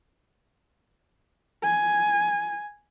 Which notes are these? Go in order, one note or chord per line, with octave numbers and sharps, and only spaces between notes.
G#5